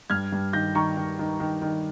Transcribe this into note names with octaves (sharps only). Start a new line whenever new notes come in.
G2 F6 G#6
G2
D#3 G6 A#6
D#3 A#5 C#6
D#3
D#3
D#3
D#3